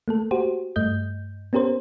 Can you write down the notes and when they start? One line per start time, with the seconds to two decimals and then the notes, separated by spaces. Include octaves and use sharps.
0.08 A3 A#3 A4
0.31 F#4 G4 C5
0.76 G2 A3 D#5 G6
1.53 B3 C#4 G4 A#4 C5